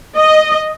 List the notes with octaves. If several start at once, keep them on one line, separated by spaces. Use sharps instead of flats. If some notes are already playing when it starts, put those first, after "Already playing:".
D#5